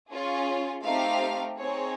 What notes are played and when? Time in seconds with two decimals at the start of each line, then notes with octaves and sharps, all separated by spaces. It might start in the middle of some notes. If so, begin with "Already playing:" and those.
0.11 C#4 F4 G#4
0.83 A3 C4 D#4 G4 F5
1.56 C4 D#4 G#4 C#5